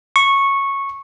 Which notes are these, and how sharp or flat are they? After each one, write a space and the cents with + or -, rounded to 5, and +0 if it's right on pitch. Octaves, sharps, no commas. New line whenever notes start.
C#6 -10